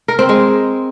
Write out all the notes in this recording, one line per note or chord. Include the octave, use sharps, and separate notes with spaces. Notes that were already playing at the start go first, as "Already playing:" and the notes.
A#4
C4
G#3